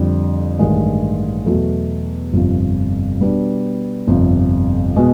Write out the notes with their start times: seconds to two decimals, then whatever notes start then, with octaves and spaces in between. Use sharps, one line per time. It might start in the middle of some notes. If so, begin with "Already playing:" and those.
Already playing: F2 D3 G3
0.59 A1 G2 D#3 G#3
1.46 E2 B2 F#3 A3
2.33 G1 F2 C3 F3
3.20 B2 G3 B3 D4
4.07 G1 F2 C3
4.96 B2 G#3